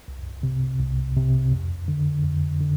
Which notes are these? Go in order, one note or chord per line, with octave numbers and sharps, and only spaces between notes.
C2
C3
C2
C3
F2
D3
F2
D3